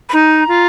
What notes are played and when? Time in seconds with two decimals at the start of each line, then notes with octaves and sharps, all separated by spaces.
0.09 B5
0.13 D#4 A#5
0.48 F4